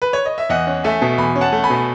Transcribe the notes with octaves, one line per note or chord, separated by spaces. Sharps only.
B4
C#5
D#5
E5
E2 D#5 F#5
C#4
A3 E5 G#5
B2
E2 G#5 B5
C#4
F#5 A5
A3
G#5 B5
B2